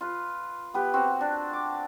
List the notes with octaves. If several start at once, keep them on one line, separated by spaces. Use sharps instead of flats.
F4 B4
B3 G4 B4
C4 F#4
D4
D6